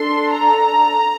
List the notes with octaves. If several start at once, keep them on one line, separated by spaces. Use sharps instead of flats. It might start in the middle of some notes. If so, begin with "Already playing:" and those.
Already playing: D4 A4 C6
A#5